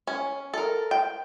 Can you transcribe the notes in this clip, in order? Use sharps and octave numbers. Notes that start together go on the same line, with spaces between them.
C#4
A4 A#4
G5